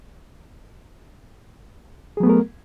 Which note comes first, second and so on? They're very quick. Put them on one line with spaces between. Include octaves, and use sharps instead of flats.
G#4 F#3 B3 A3 A#4